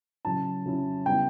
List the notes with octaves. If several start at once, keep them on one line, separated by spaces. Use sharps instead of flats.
C#3 F#3 C#4 E4 A5
C#3 F#3 C#4 E4
C#3 G3 B3 E4 G5